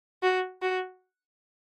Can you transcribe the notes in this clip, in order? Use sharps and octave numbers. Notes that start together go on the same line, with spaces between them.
F#4
F#4